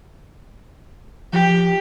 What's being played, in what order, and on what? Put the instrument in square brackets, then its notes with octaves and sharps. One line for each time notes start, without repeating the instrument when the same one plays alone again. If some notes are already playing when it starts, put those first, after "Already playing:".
[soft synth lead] F3 [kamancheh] G4